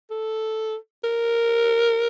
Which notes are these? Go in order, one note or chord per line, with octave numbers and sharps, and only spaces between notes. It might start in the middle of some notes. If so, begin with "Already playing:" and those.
A4
A#4